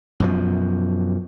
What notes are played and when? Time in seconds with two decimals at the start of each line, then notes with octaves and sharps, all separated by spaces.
0.20 F#2 B2 F3